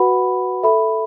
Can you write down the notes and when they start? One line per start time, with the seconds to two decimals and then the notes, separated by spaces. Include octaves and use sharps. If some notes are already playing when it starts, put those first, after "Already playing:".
Already playing: F#4 B4 F#5 B5
0.63 A4 E5 B5